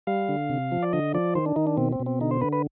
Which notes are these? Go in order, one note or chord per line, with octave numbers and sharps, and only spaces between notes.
G3 F5
D3
C3
F3
D5
D3 D#5
F3 D5
D#3 C5
D4
D#3 D#4
D4
B2 C4
C4
B2
C4
D3 D#4
C5
D3 B4
B4